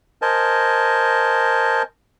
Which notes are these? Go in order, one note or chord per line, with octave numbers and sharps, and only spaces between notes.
A#4 C5 D#5 G#5 A5